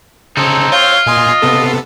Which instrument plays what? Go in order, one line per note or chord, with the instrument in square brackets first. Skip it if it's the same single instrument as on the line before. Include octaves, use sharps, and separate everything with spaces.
[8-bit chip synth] C#3 [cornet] C4 [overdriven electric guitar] D#4 A4
[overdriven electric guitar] F4 [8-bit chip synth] C#5 F5 G6
[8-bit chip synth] A#2 G#5 C6 [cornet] D#5
[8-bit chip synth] C3 B3 A4